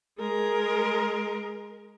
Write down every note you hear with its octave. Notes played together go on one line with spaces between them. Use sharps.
G#3 A#4